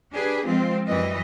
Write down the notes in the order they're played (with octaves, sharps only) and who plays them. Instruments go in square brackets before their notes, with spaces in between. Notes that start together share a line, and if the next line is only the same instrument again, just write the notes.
[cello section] D4 G4 G#4 B4
F3 G#3 C4 F4
F#2 E3 G3 B4 D#5